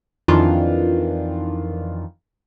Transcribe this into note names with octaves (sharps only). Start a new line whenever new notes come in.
F2 D#3 E3 D4 F4